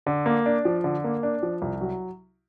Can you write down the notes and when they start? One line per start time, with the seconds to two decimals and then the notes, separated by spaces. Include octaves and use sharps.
0.06 D3
0.26 A#3
0.46 D4
0.65 F3
0.84 D3
1.04 A#3
1.23 D4
1.43 F3
1.62 C2
1.81 F#3